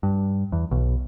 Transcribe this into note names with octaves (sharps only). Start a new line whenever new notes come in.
G2
E2
B1